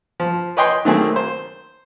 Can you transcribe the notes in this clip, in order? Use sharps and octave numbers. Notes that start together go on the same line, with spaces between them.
F3
B4 C#5 D#5 G5 G#5 C6
D#3 F#3 A3 A#3 C4 G#4
C5